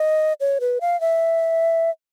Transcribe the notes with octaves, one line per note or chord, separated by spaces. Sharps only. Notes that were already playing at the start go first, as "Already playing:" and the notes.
Already playing: D#5
C#5
B4
F5
E5